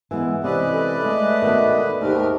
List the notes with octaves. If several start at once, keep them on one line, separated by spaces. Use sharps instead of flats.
E3 G#3 B3
C3 E3 C#4 B4 D5 D#5
A4
G#3 A3
B2 D#3
D#2 G#2 A3 G4 A#4